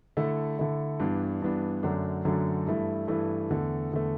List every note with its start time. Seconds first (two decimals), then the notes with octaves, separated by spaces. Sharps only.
0.17 D3 A3 E4
0.59 D3 A3 E4
1.00 G2 E3 B3 D4
1.42 G2 E3 B3 D4
1.83 F#2 D3 F#3 A3 D4
2.25 F#2 D3 F#3 A3 D4
2.67 G2 E3 A3 E4
3.08 G2 E3 A3 E4
3.50 E2 D3 A3
3.91 E2 D3 A3